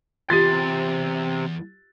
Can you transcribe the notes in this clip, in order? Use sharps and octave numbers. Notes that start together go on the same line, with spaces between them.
E2 C3 F4 G4 C6 A6